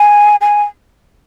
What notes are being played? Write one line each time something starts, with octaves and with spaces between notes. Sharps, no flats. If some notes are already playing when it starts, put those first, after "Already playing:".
Already playing: G#5
G#5